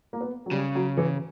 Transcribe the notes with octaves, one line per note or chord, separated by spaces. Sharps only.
A#3
B3
F#3
C#3 G3
F#3
E3